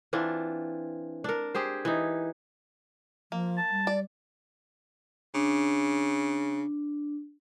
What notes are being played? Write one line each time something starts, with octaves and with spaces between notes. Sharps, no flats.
E3 C4 D4 F4
D4 A#4
G4 G#4 C5
E3 D#4
F3 A#3
A5
G3
D5
C#3 D4